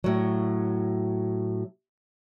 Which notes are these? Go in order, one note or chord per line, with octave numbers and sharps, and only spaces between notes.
A2 F#3